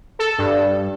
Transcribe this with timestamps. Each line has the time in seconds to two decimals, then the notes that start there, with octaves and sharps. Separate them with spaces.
0.19 A4
0.38 G2